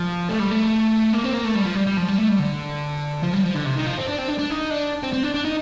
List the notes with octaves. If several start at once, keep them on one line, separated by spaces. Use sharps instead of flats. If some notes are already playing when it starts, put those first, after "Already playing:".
Already playing: F3
A3
G3
A3
A#3
C4
A#3
A3
G3
F3
G3
G3
F3
G3
A3
G3
D3
F3
G3
F3
D3
C3
D#3
F3
C4
D4
C4
D4
D4
D#4
D4
C4
C4
D4
D4
D#4